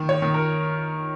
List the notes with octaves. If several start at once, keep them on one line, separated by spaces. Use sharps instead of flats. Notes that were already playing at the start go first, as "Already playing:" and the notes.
Already playing: D#3
C#5
D#3
A#4